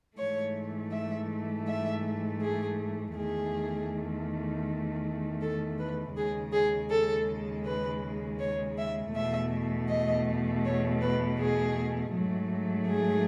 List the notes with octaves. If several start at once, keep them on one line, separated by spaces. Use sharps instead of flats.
G#2 E3 A3 C#5
E5
E5
G#4
E2 D#3 A3 G#4
A4
B4
D#2 C#3 G#3 G#4
G#4
A4
B4
C#5
E5
E2 B2 A3 E5
D#5
C#5
B4
G#4
G#2 F#3 A3
G#4